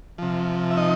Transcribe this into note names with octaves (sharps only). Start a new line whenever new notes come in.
C3 F3
E5
D#4 D#5